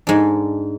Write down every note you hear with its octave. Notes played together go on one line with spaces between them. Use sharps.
G#2 G#3 D4